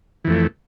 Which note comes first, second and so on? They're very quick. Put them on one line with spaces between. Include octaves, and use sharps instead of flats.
E3 F2 A3